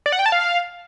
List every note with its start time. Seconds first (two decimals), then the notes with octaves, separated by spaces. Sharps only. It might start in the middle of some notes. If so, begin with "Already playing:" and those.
0.06 D5
0.12 F#5
0.19 G5
0.26 A5
0.32 F5